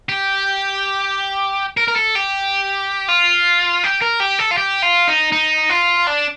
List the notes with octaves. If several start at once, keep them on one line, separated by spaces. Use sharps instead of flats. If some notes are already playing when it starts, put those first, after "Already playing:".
G4
A#4
A#4
A4
G4
F4
G4
A#4
G4
A4
F4
G4
F4
D#4
D#4
F4
D4